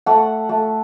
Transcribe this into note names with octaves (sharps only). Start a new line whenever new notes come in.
A3 F#5
A3